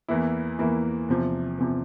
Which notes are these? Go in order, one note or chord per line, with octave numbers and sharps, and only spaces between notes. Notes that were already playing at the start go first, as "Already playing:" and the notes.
E2 E3 A#3 E4
E2 E3 A#3 E4
E2 C3 F3
E2 C3 F3